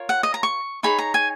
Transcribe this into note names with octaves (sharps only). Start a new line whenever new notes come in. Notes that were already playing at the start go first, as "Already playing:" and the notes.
Already playing: F4 A#4 C#5
F#5
D#5
A#5
C#6
D#4 G#4 C#5 B5
A#5
G#5